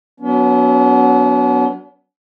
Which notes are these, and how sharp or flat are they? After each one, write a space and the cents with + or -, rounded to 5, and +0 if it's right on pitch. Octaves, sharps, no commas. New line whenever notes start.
F#3 +0 B3 +0 D4 -45